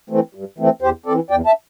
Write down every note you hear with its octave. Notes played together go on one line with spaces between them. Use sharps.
E3 A3 C4
G2
E3 A3 C4
E2 G4 C5
E3 C4 A4 D5
E2 D5 G5
E5 A5